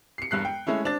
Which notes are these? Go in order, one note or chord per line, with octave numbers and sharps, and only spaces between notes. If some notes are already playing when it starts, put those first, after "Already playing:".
C7 C#7
E1 G2 F#6 C7
G5
G#3 A3 C#4 E4
C4 D4 A6